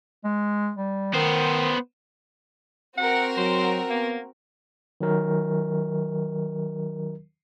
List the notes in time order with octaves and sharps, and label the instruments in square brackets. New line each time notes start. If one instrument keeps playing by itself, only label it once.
[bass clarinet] G#3
G3
[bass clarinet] D#3 [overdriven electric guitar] B3 C5
[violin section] C4 F#4 A#4 [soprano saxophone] F#5
[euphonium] F#3 [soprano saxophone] C5
[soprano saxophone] A#3 [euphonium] B3
[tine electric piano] D#3 F#3 A#4